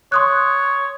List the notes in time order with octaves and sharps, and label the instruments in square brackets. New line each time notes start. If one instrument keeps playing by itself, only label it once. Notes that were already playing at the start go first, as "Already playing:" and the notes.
[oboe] C#5 [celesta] C6 D#6 F#6